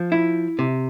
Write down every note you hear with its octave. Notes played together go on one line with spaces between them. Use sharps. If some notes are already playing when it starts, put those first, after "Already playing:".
Already playing: F3
E4
C3